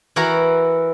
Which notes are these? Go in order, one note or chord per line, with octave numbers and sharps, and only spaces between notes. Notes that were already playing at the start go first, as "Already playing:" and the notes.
E3 E4 F#4 A#4 F#5 A#5